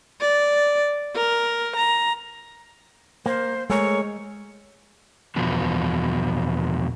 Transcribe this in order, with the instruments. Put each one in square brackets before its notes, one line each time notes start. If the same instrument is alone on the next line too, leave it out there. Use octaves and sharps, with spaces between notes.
[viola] D5
A#4
A#5
[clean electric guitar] A#3 [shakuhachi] C5
[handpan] G#3 [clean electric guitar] A3 G#4 A#4 [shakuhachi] C#5
[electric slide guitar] E2 B2 F3 B3 F#4